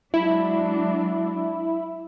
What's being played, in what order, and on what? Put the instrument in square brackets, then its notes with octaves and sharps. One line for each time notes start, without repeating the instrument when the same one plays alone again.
[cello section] F#3 G#3 D4 [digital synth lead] E4